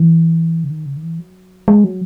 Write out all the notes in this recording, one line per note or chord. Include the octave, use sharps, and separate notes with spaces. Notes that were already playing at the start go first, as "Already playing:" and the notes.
Already playing: E3
C#3
D#3
C#3
D#3
E3
F#3
G#3
F#3